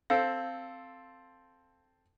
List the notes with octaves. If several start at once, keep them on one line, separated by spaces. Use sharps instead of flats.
C4 A4 F5